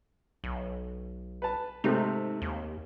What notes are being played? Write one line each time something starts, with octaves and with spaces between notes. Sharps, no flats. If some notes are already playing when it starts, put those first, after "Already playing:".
B1
B4 A5
G#2 C3 A3 D#4
D#2